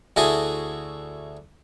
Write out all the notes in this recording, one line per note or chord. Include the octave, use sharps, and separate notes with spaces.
D2 E4 F#4 G#4 A4